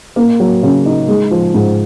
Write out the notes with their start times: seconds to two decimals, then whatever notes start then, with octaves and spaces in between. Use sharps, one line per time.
0.16 A#3
0.40 F#3
0.63 C#3
0.86 D#4
1.08 G#3
1.31 F3
1.54 G#2